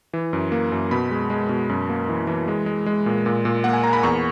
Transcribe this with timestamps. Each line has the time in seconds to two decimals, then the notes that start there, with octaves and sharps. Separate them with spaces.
0.13 E3
0.33 F#2
0.52 A#3
0.72 F#2
0.91 B2 B5
1.11 G#3
1.30 G#3
1.49 B2
1.69 F#2
1.89 A#3
2.09 E3
2.27 E3
2.48 G#3
2.66 G#3
2.86 G#3
3.06 A#2
3.26 A#2
3.45 A#2
3.64 A#3 F#5
3.73 G#5
3.84 A#3 A#5
3.93 B5
4.03 E2 C#6